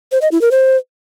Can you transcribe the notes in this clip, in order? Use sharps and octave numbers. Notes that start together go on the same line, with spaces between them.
C5
D#5
E4
A#4
C5